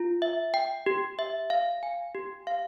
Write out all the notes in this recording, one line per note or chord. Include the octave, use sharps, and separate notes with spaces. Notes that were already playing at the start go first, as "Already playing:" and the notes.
Already playing: F4
E5
G5
G4
E5
F5
G#5
G4
F5